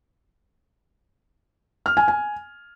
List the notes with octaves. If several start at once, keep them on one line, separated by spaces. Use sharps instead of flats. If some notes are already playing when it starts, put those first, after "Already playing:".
F6
G#5
G#5